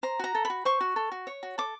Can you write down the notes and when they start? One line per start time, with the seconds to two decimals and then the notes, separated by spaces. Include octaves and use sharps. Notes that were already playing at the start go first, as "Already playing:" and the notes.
0.03 C5 A#5
0.19 F#4 A#5
0.35 A4
0.45 B5
0.50 F#4
0.65 C5 C#6
0.81 F#4
0.96 A4
1.12 F#4
1.27 C#5
1.43 F#4
1.58 A4 D6